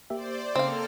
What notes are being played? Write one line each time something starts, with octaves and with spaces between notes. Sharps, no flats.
A#3 G4 C5 D5 E5
C#3 A#3 C4 A4 F5 F6